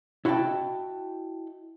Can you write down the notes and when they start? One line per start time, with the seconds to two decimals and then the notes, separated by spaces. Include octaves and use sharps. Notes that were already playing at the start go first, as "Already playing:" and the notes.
0.25 E4 F#4 D#5 F#5 G5 A5